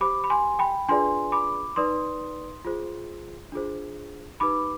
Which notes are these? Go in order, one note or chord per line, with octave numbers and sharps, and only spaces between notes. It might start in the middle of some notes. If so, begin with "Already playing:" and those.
G4 C5 B5 D6
B5
G#5 C6
G5 B5
D4 F4 G#4 B4 D5 G#5 C6
B5 D6
D#4 B4 D5 C6 D#6
F4 G#4 C5
D4 F4 G#4 C5
D#4 G4 B4 B5 D6